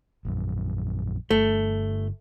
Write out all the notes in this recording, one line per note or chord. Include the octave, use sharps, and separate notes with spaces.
A#1 F#2
G1 A3